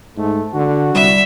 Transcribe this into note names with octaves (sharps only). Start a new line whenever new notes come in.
G#2 A3
D3 F#4
C2 G3 E5